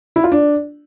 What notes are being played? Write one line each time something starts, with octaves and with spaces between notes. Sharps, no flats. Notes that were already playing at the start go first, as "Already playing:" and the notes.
E4
F4
D4